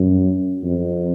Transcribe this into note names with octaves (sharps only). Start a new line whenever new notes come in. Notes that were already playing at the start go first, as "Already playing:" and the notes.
Already playing: F#2
F2